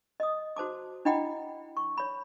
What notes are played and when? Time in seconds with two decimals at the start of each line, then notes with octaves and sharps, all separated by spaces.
0.20 D#5 D#6
0.56 F#4 C5 A5 D6
1.05 D4 E4 D#5 F#5 G5 B5
1.77 C#6
1.98 C#5 B5